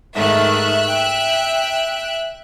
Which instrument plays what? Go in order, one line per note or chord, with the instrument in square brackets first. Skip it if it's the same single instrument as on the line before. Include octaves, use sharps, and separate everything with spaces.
[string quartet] G#2 D#3 A3 [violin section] E5 F#6
[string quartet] G5